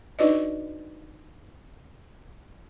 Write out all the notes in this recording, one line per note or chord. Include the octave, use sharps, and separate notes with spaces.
D4 D#4 F#4 B4 D5 D#5